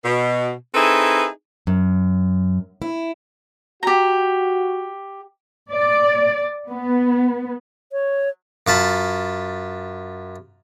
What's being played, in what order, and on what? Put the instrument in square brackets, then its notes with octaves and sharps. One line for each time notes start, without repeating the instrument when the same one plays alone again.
[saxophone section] B2
C4 D#4 E4 G#4 A4 B4
[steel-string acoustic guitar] F#2
E4
[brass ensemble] F#4 [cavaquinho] G4 A#5
[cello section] D5
B3
[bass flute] C#5
[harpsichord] F#2 F4 A5 B5